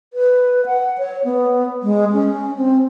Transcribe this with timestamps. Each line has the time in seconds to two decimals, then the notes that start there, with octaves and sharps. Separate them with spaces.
0.14 B4
0.66 F#5
0.98 C#5
1.25 B3
1.83 G#3
2.13 C#4
2.57 C4